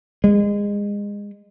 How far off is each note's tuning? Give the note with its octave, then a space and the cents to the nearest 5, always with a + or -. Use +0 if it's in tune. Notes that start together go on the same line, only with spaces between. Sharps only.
G#3 -25